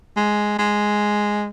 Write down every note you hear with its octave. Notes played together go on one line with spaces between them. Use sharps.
G#3
G#3